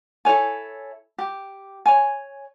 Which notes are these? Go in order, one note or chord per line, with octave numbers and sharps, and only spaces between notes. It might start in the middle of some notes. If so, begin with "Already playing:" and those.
E4 A4 C#5 G#5
G4
C#5 G#5